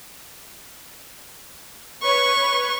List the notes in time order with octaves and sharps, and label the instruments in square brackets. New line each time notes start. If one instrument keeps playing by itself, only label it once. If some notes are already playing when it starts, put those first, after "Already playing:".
[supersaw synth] B4 C#5 [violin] C#6